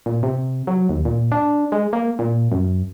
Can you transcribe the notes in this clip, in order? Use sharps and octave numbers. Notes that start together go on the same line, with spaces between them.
A#2
C3
F#3
D#2
A#2
D4
G#3
A#3
A#2
F#2